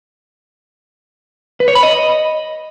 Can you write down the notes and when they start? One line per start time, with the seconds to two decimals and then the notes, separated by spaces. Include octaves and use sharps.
1.60 B4
1.68 C#5
1.75 B5
1.83 D#5